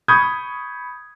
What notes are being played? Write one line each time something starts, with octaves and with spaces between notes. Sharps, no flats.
B5 C#6 D#6 G6 G#6